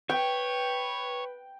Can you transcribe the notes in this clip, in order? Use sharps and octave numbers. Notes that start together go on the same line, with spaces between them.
B4 C#5 G5